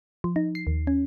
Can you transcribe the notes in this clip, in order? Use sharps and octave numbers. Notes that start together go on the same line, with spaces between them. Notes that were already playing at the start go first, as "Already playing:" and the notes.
F3
D#4
C7
D#2
C#4